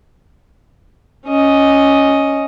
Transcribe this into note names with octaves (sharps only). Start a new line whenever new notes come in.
C#4 D#5